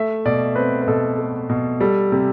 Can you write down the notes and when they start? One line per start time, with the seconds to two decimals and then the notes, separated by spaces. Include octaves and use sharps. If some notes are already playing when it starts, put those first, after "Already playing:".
Already playing: A3 E5
0.25 B2 D5
0.56 C4 B4
0.82 B4
0.88 B2 A4
1.18 A3
1.49 B2
1.81 G3 A4
2.12 C3